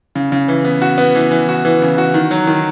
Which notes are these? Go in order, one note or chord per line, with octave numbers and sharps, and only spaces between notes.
C#3
C#3
E3
B3
F#4
B3
E3
E3
F#4
E3
C#3
F#4
D#3
F#3
D#3